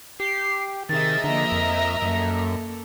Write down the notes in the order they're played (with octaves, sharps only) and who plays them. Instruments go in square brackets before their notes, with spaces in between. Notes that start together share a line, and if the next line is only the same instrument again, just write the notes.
[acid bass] G4 [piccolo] C7
[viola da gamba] C3 D#4 G#4 [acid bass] D#3 [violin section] A#4 D#5 E5 [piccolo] A6
[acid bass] D3 [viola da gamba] F3 A#3 [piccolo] A#5
[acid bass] F2
[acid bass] F#2 [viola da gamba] A#3 A4